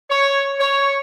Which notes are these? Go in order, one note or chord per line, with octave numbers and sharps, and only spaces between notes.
C#5
C#5